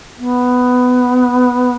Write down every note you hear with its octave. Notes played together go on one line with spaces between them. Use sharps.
B3